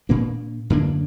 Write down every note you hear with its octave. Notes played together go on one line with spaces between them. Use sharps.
A#2 A#3 D4
F#2 D3 A#3 D4